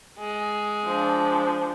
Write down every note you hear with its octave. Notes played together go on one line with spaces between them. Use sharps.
G#3
F3 D4